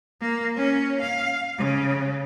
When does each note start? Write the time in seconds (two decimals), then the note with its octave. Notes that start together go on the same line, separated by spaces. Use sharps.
0.21 A#3
0.57 C#4
1.00 F5
1.58 C#3